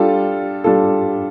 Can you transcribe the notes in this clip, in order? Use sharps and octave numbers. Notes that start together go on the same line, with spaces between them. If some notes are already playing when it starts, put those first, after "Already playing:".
Already playing: G3 D4 F4 A4
G3 D4 F4 A4